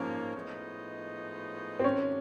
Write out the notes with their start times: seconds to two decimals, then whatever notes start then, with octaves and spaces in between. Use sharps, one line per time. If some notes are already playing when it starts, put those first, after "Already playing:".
Already playing: G#2 F3 A#3 C#4
0.35 A2 F3 G#3 B3 D#4
1.80 C4
1.84 C3 D#3 F#3 A3 C#4 D4